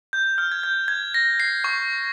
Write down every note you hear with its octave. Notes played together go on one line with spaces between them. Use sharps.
G6
F6
G#6
G6
G#6
A#6
C7
C#6